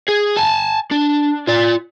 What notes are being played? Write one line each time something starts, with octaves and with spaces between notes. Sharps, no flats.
G#4
G#5 A5
D4
F4 D5